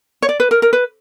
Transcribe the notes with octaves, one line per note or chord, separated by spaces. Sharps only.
C#5
D5
B4
A#4
A#4
B4